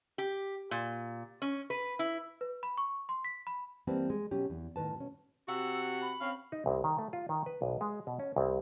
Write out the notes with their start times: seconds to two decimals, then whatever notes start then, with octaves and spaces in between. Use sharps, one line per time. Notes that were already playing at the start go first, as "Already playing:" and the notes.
0.18 G4
0.71 A#2
1.42 C#4
1.70 B4
1.99 E4
2.41 B4
2.63 B5
2.78 C#6
3.09 C6
3.25 B6
3.47 B5
3.87 E3 G3 A#3 C4 B4 A5
4.10 G#3
4.31 B2 F#3 C#4 G4
4.50 E2
4.76 A2 D#3 B4 A5
4.96 B2 C#4
5.48 C3 F#4 F#5 E6
6.01 B5
6.21 C4 C#4 F5
6.52 D#4
6.66 C2
6.84 D#3
6.99 A3
7.13 F4
7.29 D#3
7.46 B4
7.62 B1
7.81 G#3
8.07 B2
8.20 C#4
8.36 C2